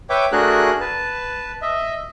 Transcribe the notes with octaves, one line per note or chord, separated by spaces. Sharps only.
B4 C#5 E5 G5 D6
A3 D4 F#4 G#4 A#4 F#6
B4 A5
D#5 E5